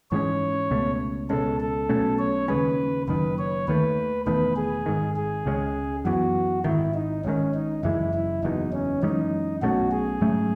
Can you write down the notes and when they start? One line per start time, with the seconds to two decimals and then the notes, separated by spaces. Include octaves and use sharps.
0.11 G#2 E3 G#3 C#4 C#5
0.71 C#2 B2 A3 C#4
1.30 C#2 B2 G#3 C#4 A4
1.60 A4
1.89 B1 B2 A3 C#4
2.19 C#5
2.48 D#2 C#3 G#3 C#4 B4
3.08 F#1 F#2 D#3 B4
3.39 C#5
3.68 D#2 D#3 A3 B4
4.27 E1 E2 D#3 A3 B4
4.56 G#4
4.86 G#1 G#2 D#3
5.16 G#4
5.46 C#2 C#3 G#3 C#4
6.05 F#2 E3 B3 F#4
6.64 G#1 G#2 D#3 E4
6.94 D#4
7.25 G#1 G#2 D#3 C#4
7.55 D#4
7.83 F#1 F#2 E3 G#3 E4
8.14 E4
8.43 F#1 E2 B2 D#4
8.73 C#4
9.02 F#2 E3 G#3 C#4 D#4
9.62 B1 B2 A3 C#4 F#4
9.92 G#4
10.21 G#2 F#3 A3 C#4